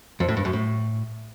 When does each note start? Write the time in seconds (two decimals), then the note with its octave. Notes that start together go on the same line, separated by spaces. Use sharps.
0.20 F2
0.28 A2
0.37 G2
0.45 F#2
0.53 A2